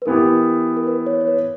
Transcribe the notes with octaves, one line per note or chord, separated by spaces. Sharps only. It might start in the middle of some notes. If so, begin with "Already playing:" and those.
B4
E3 B3 E4 G4 A#4
A#4
B4
C#5
C#5
B4